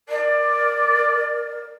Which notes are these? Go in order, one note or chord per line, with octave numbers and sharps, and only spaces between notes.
A#4 D5